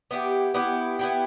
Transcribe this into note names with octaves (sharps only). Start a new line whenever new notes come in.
B3 E4 G4
B3 E4 G4
B3 E4 G4